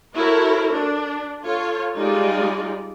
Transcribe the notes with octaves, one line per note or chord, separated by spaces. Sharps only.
E4 F#4 A4 A#4 C5 C#5
D4
F4 A4 C#5
G3 G#3 D#4 F4 D5